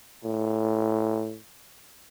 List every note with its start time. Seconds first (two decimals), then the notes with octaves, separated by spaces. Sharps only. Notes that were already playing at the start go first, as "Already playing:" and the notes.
0.24 A2